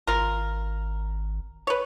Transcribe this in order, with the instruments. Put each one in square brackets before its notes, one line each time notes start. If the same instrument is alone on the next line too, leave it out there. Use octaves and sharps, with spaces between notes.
[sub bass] G#1 [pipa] F4 A#4
[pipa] B4 C#5